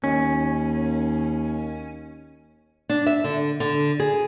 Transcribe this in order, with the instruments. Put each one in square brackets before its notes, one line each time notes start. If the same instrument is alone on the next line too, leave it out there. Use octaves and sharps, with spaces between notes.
[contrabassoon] D#2 [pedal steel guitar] C#4
[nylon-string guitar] D4
E5
D3
D3
G#4